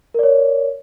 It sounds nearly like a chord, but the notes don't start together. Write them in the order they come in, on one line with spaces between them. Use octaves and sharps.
A#4 D5 C#5